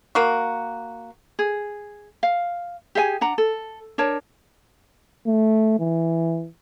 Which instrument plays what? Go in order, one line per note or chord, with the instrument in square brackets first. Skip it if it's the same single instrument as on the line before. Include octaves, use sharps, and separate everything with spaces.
[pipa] A#3 F#4
[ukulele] G#4
F5
G4 G#4 E5 G#5
D4 F#5 A#5
A4
D4 A#4 C#5 A5
[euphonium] A3
E3